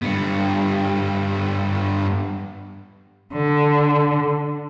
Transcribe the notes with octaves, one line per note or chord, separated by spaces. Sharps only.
G2 B3
D3